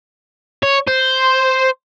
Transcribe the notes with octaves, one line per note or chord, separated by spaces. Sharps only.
C#5
C5